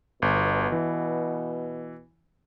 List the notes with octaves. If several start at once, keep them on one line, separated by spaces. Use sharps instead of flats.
G1 B2
E3